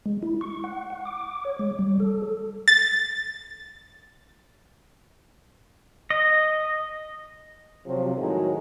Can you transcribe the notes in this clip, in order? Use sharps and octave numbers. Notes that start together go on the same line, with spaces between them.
G#3
E4
C#6
F#5
F#5
D6
C#5
G#3
G3
A4
A6
D#5
C3 F3 F#3
A2 D#3 F#3 G#3 D#4 F#4